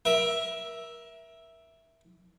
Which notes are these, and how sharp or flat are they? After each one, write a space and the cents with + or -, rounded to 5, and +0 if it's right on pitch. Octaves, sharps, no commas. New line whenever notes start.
A#4 +25 E5 +0